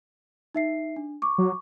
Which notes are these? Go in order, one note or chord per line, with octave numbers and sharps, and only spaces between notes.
D#4 E5 C7
D4
C#6 D6
F#3